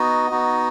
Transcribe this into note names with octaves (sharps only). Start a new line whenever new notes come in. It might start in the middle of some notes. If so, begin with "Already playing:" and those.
Already playing: B3 D#4 F#4 D#5
B3 D#4 F#4